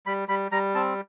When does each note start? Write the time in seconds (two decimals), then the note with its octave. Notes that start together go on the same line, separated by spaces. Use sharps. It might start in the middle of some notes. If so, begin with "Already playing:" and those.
0.06 G3 B5
0.28 G3 B5
0.51 G3 A#5
0.74 C4 A5